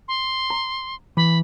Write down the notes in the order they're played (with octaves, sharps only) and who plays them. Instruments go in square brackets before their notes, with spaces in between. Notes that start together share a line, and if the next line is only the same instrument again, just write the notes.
[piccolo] C6
[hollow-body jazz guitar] A#5
[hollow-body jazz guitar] E3 [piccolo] B5